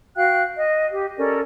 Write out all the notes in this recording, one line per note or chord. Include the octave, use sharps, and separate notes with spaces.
F#4 F5 G5 F#6
D#5
G4
C#4 A4 A#4 D5